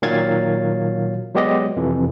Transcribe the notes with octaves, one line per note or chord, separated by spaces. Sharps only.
A#2 D#3 F#3 F5 G#6 A6
F#3 G#3 B3 G4 D5 D#5
F2 C3 E3